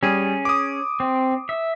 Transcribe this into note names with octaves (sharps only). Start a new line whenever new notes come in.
G3 C#4 G#4
D6 D#6
C4
E5